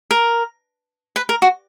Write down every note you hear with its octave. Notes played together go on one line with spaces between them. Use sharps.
A#4
B4
A#4
F#4